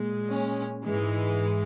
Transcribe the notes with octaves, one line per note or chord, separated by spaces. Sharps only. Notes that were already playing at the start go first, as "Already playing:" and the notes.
Already playing: A#2 G#3
C#4
G#2 E3 G#3